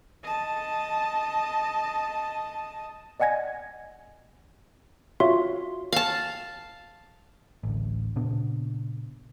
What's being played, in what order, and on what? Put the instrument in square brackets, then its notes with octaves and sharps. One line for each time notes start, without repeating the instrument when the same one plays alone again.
[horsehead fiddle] D#5 A5
[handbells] D5 D#5 F#5 G#5 G#6 A#6
F4 F#4 C#5 E5 F5 C6
[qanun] F5 A5
[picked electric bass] A1 D2
A#2 C#3 B3 D4